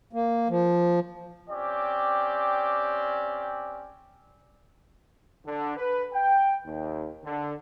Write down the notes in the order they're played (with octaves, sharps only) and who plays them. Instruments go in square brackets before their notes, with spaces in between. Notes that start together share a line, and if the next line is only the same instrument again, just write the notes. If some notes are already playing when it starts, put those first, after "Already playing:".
[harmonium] A#3
F3
[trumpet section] C4 C#4 G4 D5
[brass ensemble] D3
B4
G5
D#2
D3